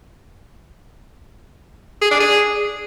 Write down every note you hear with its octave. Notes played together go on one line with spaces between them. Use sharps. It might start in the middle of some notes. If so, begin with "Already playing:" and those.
G#4
D4
G#4